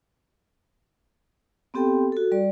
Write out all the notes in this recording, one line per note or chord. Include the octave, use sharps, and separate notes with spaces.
B3 C4 G4 A4 G5
F#4 A4
G3 D5